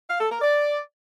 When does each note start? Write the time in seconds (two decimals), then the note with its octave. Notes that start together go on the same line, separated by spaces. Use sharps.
0.10 F5
0.20 A4
0.31 A#4
0.42 D5